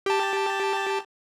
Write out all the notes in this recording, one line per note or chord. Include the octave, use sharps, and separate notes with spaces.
G4 A5